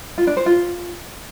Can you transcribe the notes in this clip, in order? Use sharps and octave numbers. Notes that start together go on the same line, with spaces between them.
F4
D4
C5
F4